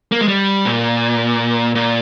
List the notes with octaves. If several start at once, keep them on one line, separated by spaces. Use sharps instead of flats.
A#3
G#3
G3
A#2
A#2